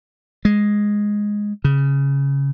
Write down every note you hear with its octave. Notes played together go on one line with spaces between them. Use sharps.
G#3
C#3